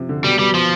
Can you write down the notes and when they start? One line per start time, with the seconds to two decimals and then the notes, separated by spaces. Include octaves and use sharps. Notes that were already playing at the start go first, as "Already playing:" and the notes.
Already playing: C3 F3
0.09 D3
0.24 B2 G3
0.39 B2 G3
0.54 F3